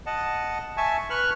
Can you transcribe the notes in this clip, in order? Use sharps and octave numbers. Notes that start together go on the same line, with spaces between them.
D#5 F#5 A5
E5 G#5 A5 C#6
B4 C#6 F6 F#6